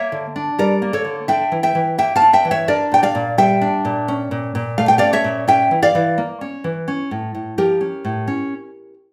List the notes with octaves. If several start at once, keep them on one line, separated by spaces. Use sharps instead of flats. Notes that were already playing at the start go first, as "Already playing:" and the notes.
Already playing: A#3 C#5 E5
D3
D4
G3 A#4 D5
A#3
A4 C#5
D3
D4 E5 G5
E3
E5 G5
E3
A#3 E5 G5
F5 A5
D4
E5 G5
E3
C#5 E5
D4 A#4 D5
A#2 G5
D5 F5
A#2
G3 E5 G5
D4
A#2
C#4
A#2
A#2
A3 F5
G5
C#4 D5 F5
C#5 E5
A#2
C#4 E5 G5
E3
D5 F5
E3
A#3
C#4
E3
C#4
A2
A2
F3 G4 A#4
C#4
A2
C#4